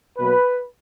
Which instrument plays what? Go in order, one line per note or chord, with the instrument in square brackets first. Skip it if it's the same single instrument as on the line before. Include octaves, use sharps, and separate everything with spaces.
[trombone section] B2 F#3 A#3 B4